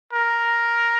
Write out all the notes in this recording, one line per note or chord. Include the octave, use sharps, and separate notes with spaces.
A#4